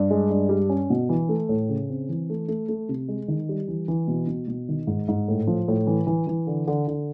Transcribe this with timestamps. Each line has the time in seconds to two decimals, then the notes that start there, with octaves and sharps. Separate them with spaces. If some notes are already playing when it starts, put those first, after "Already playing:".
Already playing: G2
0.11 G#3
0.30 G2
0.49 G3
0.70 C#4
0.90 B2
1.09 E3
1.29 A3
1.49 A2
1.69 C#3
1.90 C4
2.09 E3
2.30 A3
2.48 A3
2.69 A3
2.89 C3
3.08 G#3
3.28 D#3
3.49 G3
3.68 E3
3.88 E3
4.08 B2
4.27 B2
4.48 B2
4.69 D#3
4.87 G#2
5.08 G#2
5.28 A2
5.47 F3
5.68 A2
5.87 E3
6.07 E3
6.27 E3
6.47 D3
6.67 D3
6.88 D3